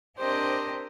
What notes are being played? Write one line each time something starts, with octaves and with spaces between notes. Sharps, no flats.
C4 D4 G4 A#4 C5 D#5